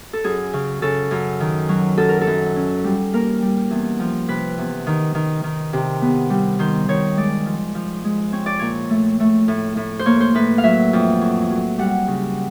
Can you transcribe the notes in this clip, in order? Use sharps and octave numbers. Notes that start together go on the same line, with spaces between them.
A4
F#2 G#4
C#3
C#3 A4
F#2
D#3
F#3
F#2 A4
A#4
A4
F#2
C#4
G3
A#3 A#4
G3
E2
F3
C3 B4
E2
D#3
D#3
D#3
C3
B3
G3
D#3 C5
D#3 C#5
G#3 D5
F3
F3
G#3
C4 C#5
D5
A#2 C#5
A3
A3
A2
A2
C5
A#3 C#5
C5
A2 B4
F5
F#3 E5
F2
F#3
F#3
G3 F#5
C#3